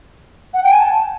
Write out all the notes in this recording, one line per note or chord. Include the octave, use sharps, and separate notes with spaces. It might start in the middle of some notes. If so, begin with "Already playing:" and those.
F#5
G5
G#5
A5